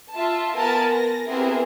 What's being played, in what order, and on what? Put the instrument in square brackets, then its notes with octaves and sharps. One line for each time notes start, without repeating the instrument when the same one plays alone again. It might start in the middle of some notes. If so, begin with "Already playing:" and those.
[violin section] F4 E5 A5
B3 A#4 G#5 A5 B5 A6
A#6
B3 C4 E4 G4 G#4 A#4